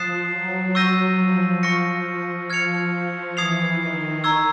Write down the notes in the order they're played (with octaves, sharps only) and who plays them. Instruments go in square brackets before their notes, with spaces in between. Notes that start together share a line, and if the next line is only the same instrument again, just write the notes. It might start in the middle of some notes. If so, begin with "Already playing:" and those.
Already playing: [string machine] F3 [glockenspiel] D#6 F#6 A6 C7 E7
[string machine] F#3
[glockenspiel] C#6 E6 G6 A#6 D#7
[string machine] F3
[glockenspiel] C#6 F6 A#6 C#7
[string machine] F3
[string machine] F3 [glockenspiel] F6 G#6 C#7 F7
[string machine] E3 [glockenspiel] D#6 G#6 C7 F7
[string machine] D#3
[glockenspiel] A#5 C#6 E6 G#6